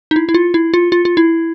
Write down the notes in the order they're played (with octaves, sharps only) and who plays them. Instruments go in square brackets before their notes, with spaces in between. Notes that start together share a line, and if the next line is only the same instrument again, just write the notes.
[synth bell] D#4
E4
E4
F4
E4
F4
F4
F4
E4